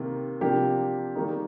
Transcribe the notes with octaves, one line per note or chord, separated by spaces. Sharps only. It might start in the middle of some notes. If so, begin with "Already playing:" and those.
Already playing: C3 D#3 A#3
C3 F3 A#3 D4 G4
D#3 G3 A#3 D#4